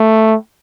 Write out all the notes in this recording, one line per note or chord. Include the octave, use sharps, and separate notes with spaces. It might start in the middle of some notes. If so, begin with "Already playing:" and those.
Already playing: A3